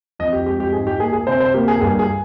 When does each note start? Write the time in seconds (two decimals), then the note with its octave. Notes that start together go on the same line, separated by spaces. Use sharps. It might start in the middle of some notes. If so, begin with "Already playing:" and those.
0.19 F2 D#5
0.33 G4
0.46 G#3 G4
0.60 G4
0.73 G#2 G#4
0.87 G4
1.00 A#3 G#4
1.13 G#4
1.27 C3 C5
1.40 C5
1.54 A#3 G4
1.68 G#4
1.81 G2 G#4
1.99 G#4